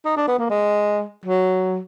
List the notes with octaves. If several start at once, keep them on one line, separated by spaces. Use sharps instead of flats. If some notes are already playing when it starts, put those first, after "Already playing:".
D#4
D4
B3
A#3
G#3
F#3